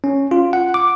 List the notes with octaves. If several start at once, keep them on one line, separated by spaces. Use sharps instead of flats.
C#4
F4
F#5
D6